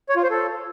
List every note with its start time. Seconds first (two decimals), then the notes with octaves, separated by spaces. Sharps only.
0.09 C#5
0.16 F4
0.23 C5
0.30 A4